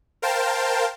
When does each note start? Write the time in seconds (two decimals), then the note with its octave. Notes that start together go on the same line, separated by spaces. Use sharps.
0.22 A#4 C5 F5 G5 A5